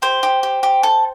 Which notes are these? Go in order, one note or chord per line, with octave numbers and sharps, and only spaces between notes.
G4 C5
G4
G4
G4
A4